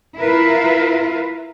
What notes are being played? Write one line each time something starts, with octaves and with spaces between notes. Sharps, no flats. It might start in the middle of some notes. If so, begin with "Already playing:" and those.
E4 F4 A#4 B4 E5 F5